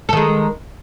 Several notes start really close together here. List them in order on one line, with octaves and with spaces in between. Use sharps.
A4 D#3 G#3